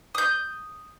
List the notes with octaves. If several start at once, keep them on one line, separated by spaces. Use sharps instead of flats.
D#6 G6